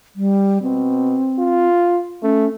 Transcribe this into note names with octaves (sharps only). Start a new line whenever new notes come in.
G3
B2 C4
F4
A3 C#4